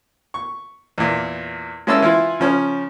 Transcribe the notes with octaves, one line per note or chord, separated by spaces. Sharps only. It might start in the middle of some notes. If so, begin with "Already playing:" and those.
C#6
E2 A#2
G#3 A#3 C#4 E4 A5 E6
E3 E4 F4
C#3 F3 C#4